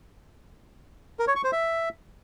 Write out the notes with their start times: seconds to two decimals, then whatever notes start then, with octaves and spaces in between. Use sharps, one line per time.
1.19 A#4
1.28 C#5
1.36 C#6
1.44 C5
1.52 E5